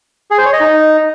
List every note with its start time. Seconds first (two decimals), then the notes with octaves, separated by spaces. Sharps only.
0.31 G#4
0.38 C5
0.46 C#5
0.53 D#5
0.60 D#4